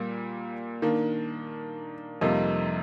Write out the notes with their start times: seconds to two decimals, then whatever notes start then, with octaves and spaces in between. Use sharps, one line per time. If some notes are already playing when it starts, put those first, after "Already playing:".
Already playing: A#2 G3 A#3
0.82 D#3 A#3 D4
2.21 F2 C3 G3 A#3 D#4